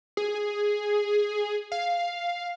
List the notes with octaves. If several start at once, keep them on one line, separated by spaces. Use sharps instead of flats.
G#4
F5